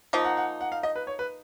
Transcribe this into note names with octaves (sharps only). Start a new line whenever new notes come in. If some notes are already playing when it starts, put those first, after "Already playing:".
F3 A#3 D#4 D#5
F#5
F#5
F#5
F5
D#5
B4
C#5
B4